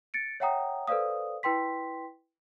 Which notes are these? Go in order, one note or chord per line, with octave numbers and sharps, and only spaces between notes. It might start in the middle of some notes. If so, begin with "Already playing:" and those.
A6 C#7 D7
C#5 E5 F#5 G5 A#5 D#6
A4 B4 C5 D5 F5 D#6
E4 B4 G5 C6 B6